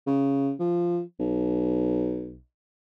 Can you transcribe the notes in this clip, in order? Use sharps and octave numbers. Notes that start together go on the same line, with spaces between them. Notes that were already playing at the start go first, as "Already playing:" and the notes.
C#3
F3
B1